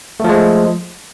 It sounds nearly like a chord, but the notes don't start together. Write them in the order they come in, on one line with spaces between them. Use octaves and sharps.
A3 F3 G#3